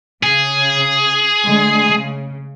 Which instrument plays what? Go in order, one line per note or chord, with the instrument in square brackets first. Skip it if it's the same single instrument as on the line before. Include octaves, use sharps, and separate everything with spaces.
[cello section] C#3 [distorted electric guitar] G#4
[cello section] D3 G#3 A3
C#3